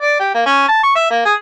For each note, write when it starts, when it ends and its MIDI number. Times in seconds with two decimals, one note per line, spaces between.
0.02 0.16 74
0.20 0.30 67
0.34 0.44 58
0.46 0.67 61
0.68 0.81 81
0.83 0.92 85
0.95 1.10 76
1.10 1.23 58
1.25 1.34 68